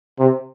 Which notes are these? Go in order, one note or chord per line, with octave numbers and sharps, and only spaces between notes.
C3